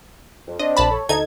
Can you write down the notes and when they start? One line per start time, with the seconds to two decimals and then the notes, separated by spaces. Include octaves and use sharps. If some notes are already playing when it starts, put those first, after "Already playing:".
0.47 F2
0.59 C4 D4 D#5
0.77 A#1 A5 B5
0.91 A4 C#5
1.09 D2 D#4 A4 G#6